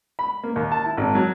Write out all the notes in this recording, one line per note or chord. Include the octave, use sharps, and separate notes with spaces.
B5
A#3
D#2
A5
E4
G#1
F#3